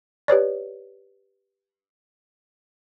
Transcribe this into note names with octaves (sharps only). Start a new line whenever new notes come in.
G4 B4 C#5 D5